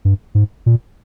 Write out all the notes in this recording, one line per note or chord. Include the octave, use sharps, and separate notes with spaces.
G2
G#2
A#2